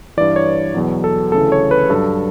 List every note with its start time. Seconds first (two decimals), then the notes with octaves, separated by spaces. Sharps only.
0.17 G2 E3 D5
0.36 C#5
0.74 E2 B2 F#3
1.04 A4
1.32 D2 C#3 E3 A4
1.52 C#5
1.71 B4
1.90 G2 F#3 A4